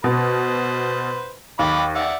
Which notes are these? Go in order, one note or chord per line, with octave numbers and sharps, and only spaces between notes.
B2 B4 C5
D#2 D#5 B5 D6
D5 E5 F#5